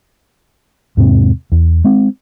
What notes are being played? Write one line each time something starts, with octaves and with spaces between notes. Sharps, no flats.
E2 G#2 C3 C4
E2
G#3 C4